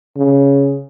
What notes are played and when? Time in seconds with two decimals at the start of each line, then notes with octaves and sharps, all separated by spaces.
0.17 C#3